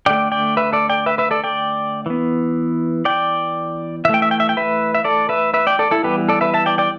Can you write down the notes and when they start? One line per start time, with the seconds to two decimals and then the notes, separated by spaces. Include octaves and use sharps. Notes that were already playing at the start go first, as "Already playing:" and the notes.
0.06 D3 A3 D5 G5
0.32 D5 G5
0.57 B4 E5
0.73 A4 D5
0.90 D5 G5
1.06 B4 E5
1.18 B4 E5
1.31 A4 D5
1.44 D5 G5
2.06 E3 B3
3.05 D5 G5
4.05 E3 E5
4.09 A3 G5
4.22 E5
4.31 G5
4.40 E5
4.49 G5
4.57 B4 E5
4.95 E5
5.05 A4 D5
5.29 B4 E5
5.54 B4 E5
5.67 D5 G5
5.79 A4 D5
5.91 E4 A4
6.03 E3 G3 B3 G4 B4
6.29 A4 D5
6.41 B4 E5
6.54 E5 A5
6.66 D5 G5
6.78 D5 G5